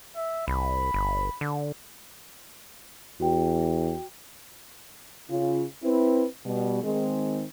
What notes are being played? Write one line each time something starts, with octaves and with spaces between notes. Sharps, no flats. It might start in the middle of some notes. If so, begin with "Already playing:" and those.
E5
C2 B5
G1
D3
E2 F#4 G5
C#3 F4
C4 E4 B4
B2 G3
D#3 G#3 C4